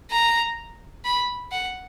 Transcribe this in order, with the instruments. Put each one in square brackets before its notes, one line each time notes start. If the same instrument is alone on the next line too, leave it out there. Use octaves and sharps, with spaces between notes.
[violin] A#5
B5
F#5